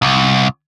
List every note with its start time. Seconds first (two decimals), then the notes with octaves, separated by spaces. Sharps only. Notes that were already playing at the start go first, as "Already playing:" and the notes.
0.02 C2